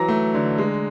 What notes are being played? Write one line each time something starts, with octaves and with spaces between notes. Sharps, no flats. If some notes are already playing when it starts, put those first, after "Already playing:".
Already playing: E3 F#3 A#5 A#6
A3
D3
G#3